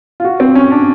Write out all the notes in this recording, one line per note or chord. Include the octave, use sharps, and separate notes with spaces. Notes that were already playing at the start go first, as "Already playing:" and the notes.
F4
F#4
C4
C#4
D4